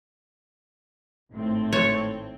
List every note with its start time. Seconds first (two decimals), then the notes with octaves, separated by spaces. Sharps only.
1.32 G#1 A2 C4
1.73 C#5 A5